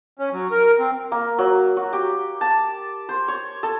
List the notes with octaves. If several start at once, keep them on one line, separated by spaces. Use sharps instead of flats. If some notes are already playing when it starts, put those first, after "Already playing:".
C#4
F#3
A#4
C4
A#3
F#3
F#4
G4
A5
C5
C#5
A4